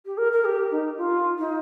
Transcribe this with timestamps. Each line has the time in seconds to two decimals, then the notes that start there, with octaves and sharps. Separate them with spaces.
0.06 G4
0.18 A#4
0.33 A#4
0.45 G4
0.71 D#4
0.98 F4
1.38 D#4